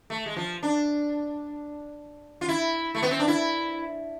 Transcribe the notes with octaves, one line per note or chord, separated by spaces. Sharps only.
A3
G#3
F3
D4
F4
E4
A3
B3
C4
D4
E4